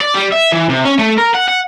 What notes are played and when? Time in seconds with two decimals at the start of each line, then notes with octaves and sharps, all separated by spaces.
0.01 D5
0.15 G3
0.32 E5
0.52 E3
0.69 C3
0.85 C#4
0.99 A3
1.18 A#4
1.34 F#5
1.48 F#5